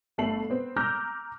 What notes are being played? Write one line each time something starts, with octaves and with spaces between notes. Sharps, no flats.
G1 A3 A4 C7 F#7
B3 C4
A#5 D6 E6 F6 G6 A#6